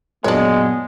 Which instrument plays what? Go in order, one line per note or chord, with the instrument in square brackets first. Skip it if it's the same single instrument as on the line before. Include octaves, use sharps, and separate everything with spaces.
[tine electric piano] F#2 A#2 F#3 [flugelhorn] G#3 [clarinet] B3 [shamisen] D4 C#5